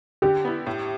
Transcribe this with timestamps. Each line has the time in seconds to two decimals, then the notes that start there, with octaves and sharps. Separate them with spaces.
0.22 D3 G4
0.45 B3 E4
0.67 A2